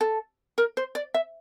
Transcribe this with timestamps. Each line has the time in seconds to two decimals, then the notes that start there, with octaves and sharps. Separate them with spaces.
0.01 A4
0.58 A#4
0.77 C5
0.95 D5
1.14 E5